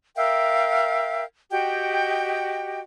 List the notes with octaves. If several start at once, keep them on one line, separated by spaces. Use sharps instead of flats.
A#4 E5 F5 G5
F#4 G4 D#5 G5